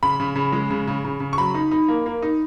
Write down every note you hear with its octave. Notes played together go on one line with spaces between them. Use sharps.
C#3 B5
C#3
C#3
G#3
C#3
C#3
C#3
C#3
C#6
F#3 B5
D#4
D#4
A#3
A#3
D#4